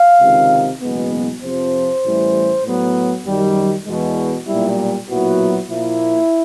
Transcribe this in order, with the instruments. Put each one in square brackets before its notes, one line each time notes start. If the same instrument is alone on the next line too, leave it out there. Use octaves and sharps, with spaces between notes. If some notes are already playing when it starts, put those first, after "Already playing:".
Already playing: [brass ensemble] F5
C#2 C3 D#3
F#1 E2 B2 G#3 B3
F2 C3 F3 C5
A1 A2 E3 G3
A2 F#3 B3
F#2 D#3 G3
E2 B2 G#3
B1 A#2 G3 E4
B1 A#2 F#3 B3 E4 F#4
A#2 F3 A#3 E4